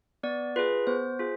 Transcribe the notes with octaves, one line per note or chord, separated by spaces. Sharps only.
B3 D5
F4 G#4 B4
B3 C5
F4 G#4